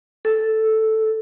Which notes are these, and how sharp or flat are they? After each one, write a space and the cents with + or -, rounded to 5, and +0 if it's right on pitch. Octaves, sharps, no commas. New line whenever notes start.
A4 +0